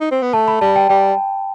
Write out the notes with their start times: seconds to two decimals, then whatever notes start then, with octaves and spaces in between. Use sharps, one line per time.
0.01 D#4
0.11 C4
0.22 B3
0.33 A3 A5
0.48 B5
0.61 G3 A5
0.76 G5
0.89 G3 G5